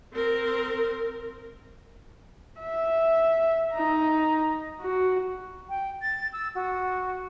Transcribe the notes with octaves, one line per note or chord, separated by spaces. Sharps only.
C4 A#4
E5
D#4 A#5
F#4
G5
A6
E6
F#4